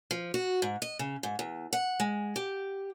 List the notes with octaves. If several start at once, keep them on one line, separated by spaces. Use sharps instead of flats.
F3
F#4
G#2
D#5
C#3
G#2
E2
F#5
G#3
G4